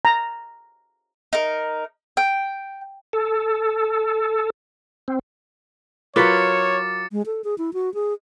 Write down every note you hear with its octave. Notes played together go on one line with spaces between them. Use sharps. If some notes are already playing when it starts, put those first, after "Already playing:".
A#5
D#4 A#4
G5
A4
C4
F#3 F4 A#4 B4 C#5 D6 A6 C#7
G#3
A4
G#4
E4
F#4
G#4